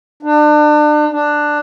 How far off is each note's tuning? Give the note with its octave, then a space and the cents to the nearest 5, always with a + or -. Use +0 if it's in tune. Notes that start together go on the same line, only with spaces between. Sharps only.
D4 +35
D4 +10